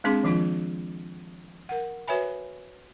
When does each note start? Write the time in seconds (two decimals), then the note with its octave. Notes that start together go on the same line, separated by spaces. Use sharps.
0.04 G#3 C4 D4 G#4 C6 D6
0.23 D#3 F3 D4 F4
1.69 A#4 F#5
2.08 F#4 B4 C#5 E5 G#5 B5